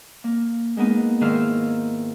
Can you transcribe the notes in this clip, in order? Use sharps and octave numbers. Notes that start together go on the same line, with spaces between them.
A#3
G#3 A#3 B3 D#4
G#2 D#3 E4 F5 E6 F6